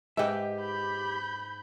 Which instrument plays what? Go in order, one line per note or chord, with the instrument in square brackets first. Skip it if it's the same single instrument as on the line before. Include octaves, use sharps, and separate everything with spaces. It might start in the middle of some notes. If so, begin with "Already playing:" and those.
[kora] G#2 B4 [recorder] G4 [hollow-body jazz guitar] E5 G5
[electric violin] B5 G6